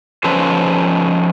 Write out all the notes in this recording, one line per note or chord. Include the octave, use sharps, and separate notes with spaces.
F3 C#4 D#4 A4 B4 C5